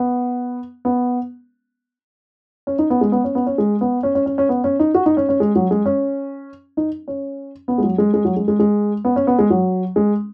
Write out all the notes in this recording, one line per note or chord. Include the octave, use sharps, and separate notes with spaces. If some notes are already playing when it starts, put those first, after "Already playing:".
Already playing: B3
B3
C#4
D#4
B3
G#3
B3
C#4
B3
C#4
G#3
B3
C#4
C#4
C#4
C#4
B3
C#4
D#4
F#4
D#4
C#4
C#4
G#3
F#3
G#3
C#4
D#4
C#4
B3
G#3
F#3
G#3
G#3
F#3
G#3
G#3
G#3
B3
C#4
B3
G#3
F#3
G#3